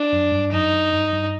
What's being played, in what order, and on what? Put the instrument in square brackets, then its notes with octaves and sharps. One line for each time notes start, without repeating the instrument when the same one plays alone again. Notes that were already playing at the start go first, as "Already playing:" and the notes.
Already playing: [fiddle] D4
[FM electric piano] F#2
G2
[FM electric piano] F#2 [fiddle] D#4
[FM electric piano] F#2
G2
G2